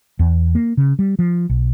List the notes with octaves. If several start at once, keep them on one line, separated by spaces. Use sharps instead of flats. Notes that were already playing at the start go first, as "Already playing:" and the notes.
E2
A#3
C#3
G3
F3
B1